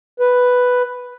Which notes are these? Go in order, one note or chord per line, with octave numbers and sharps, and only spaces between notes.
B4